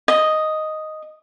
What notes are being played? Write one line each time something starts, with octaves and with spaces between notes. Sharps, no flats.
D#5